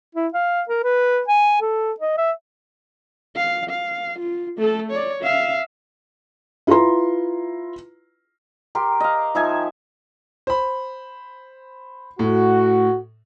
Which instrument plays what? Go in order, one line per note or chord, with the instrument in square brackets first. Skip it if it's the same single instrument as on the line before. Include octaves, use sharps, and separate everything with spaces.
[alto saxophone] E4
F5
A#4
B4
G#5
A4
D#5
E5
[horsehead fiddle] F5
F5
F4
A3 A4
C#5 D5
E5 F5
[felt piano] E4 F4 B4 A#5 C6
[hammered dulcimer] G4 A#4 C6
D#5 F5
F3 D#4 E5 G#5
[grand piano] C5 B5
[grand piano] A2 [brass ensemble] F#4